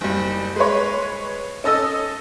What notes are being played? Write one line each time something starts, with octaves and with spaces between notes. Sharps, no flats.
F#1 G3
G#3 B4 C#5
C#4 A4 D#5 E6